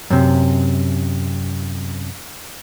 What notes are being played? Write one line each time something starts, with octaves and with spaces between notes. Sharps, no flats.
F#2 C3